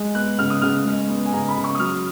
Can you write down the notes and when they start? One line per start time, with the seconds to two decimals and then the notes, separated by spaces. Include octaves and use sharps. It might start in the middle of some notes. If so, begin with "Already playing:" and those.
Already playing: G#3
0.15 B3 F#6
0.39 C#3 F6
0.50 D#6
0.62 C#3 F6
0.85 G#3
1.09 B3
1.26 G#5
1.33 C#3 A#5
1.48 B5
1.56 C#3
1.64 C#6
1.75 D#6
1.79 F#3 F6